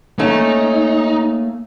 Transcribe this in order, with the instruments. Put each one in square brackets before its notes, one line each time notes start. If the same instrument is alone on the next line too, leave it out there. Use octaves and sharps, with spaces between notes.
[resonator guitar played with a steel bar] A3 C#4 [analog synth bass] A#3 [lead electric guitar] D#4